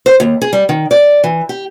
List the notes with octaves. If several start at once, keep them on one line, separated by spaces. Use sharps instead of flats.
C5
D#2
G#4
G3
D#3
D5
E3
G4